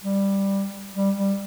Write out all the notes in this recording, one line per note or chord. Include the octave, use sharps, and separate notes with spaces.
G3
G3
G3